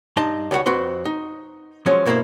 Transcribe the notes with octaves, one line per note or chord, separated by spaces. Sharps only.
G2 D#4 D#5 A5 C6
C#2 G3 B3 F#4 F#5
F2 C4 F#4 B4 C6
D#4
F3 F#3 G#3 C#4
G2 B2 A#3 D4 E4 C5